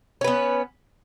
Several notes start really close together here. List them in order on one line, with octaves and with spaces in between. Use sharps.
C#4 B4 B3